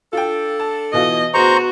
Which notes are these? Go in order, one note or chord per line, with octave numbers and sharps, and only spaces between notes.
D4 F4 A4 G5
A5
B2 E3 F4 D#5
D2 B2 B3 F#4 G#4 C5 A#5 C#6